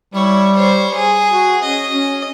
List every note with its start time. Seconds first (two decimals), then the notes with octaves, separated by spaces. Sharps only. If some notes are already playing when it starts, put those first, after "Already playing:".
0.14 G3 E4 C#5
0.57 C5 C#5
0.95 G#4
1.31 F#4
1.64 C#4 D#5
1.93 C#4